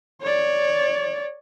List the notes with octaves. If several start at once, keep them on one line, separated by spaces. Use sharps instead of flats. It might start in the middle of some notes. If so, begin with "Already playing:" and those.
C#5 D5